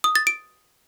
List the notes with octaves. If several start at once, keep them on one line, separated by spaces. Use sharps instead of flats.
D#6
A6
D7